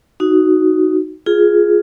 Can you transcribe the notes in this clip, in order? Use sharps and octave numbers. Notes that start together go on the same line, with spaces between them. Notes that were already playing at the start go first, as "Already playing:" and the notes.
D#4 F#4
F4 G#4